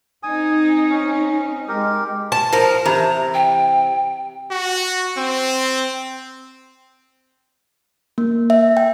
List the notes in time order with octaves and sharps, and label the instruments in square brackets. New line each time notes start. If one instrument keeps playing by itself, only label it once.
[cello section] C4 D#4 [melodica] G#5 D#6
[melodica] C#4
[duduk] G#3 [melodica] G4 A#4
[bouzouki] A5
[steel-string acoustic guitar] F3 A#4
[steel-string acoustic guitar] C3 [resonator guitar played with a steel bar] E3 A#5
[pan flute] G5
[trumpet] F#4
C4
[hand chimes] A#3
E5
G5